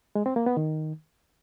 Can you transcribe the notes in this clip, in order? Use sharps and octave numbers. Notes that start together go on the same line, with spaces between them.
G#3
C4
A#3
B3
D#3